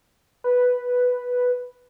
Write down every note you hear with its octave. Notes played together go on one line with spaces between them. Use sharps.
B4